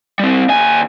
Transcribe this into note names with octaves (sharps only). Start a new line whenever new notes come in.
G3 C4
D#2 G#5